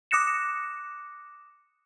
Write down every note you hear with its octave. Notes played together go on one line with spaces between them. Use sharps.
D6 D#6 F#6 A#6 C#7 E7